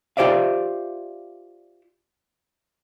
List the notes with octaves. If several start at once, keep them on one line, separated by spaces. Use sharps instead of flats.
F4 G4 C5 D5 E5 F5